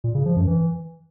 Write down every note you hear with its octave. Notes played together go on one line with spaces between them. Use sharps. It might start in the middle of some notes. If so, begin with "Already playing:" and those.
A#2
C#3
F3
F#2
E3